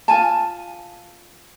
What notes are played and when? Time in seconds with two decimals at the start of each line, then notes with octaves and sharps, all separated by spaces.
0.08 F4 G#5 A5